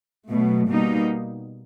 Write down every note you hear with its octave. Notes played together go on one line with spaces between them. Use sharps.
B2 F#3 A3
B2 G3 A#3 D#4